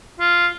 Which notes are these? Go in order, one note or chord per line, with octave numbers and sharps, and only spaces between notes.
F4